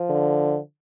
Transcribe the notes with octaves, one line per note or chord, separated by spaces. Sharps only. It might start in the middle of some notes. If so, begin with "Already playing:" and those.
Already playing: F3
D3